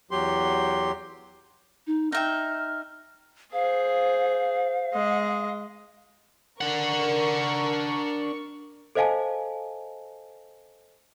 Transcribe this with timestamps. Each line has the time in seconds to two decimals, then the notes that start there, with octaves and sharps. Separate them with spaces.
0.11 E2 F#3 G4 C6
1.87 D#4
2.12 D#4 E5 G5 F6
3.53 G#4 C5 F5
4.93 G#3 D#5
6.61 D4 A#4 F#5 C#6
8.95 A4 C5 D#5 F5 G#5 A5